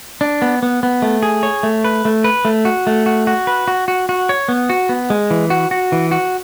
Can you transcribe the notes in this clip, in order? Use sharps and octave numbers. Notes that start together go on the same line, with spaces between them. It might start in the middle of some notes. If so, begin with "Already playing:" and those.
D4
B3
B3
B3
A3
G#4
C#5
A3
B4
A3
B4
A3
F#4
A3
F#4
F#4
B4
F#4
F#4
F#4
C#5
B3
F#4
B3
G#3
E3
F#4
F#4
E3
F#4